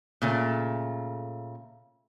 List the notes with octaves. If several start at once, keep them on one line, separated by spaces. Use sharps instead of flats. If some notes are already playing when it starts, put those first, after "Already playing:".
A#2 C#3 A3